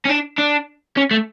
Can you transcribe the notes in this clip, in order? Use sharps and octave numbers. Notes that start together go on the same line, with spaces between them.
C#4
D4
D4
C#4
A3